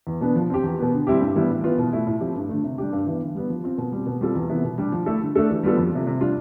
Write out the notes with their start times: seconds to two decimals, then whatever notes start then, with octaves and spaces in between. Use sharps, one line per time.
0.07 E2
0.21 B2 B3 D4
0.36 F3
0.50 C4 G4
0.63 E2
0.79 B2 B3
0.93 D3
1.07 G3 C4 E4 G4
1.21 G2
1.35 E3 G3 B3 E4
1.50 A2
1.64 E3 B3 F4
1.78 B2
1.93 A3 E4
2.07 A2
2.20 F3 C4 E4 G4
2.35 G2
2.49 D3 A3
2.64 C3
2.78 G3 D4 G4
2.92 G2
3.06 E3 B3
3.21 D3
3.35 G3 B3
3.50 F3
3.64 C4 F4
3.78 B2
3.92 G3 C4
4.06 B2
4.21 G3 C4 F4 A4
4.35 E2
4.49 C3 E3 B3 E4
4.64 B2
4.78 G3 D4 G4
4.92 F3
5.06 A3 E4 A4
5.21 D3
5.35 A3 D4 A4
5.49 E3
5.64 G3 B3 F4 A4
5.77 F2
5.92 C3 F3
6.07 C3
6.21 G3 D4 F4